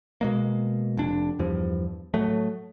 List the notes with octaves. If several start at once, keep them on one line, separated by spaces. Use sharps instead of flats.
B2 G#3 A#3
F1 D4
E2 G2 F3
A2 F#3 A3